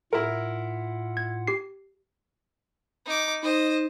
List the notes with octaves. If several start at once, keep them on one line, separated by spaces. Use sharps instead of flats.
A2 E4 F4 A#4 F#5
G#6
G4 C7
D#4 D6
D#4 C5 D#5